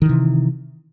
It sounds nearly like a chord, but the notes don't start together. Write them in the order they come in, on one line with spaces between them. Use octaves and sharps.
D#3 E3 C3